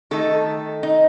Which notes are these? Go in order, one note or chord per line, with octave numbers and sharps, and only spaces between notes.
D#3 A3 D#4 A4
D#4